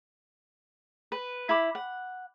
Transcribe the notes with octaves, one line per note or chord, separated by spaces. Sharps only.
B4
E4 B5 D6
F#5